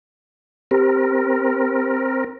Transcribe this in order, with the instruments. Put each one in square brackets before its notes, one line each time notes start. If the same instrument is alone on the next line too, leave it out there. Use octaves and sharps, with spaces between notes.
[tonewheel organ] C4 A#4 [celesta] G4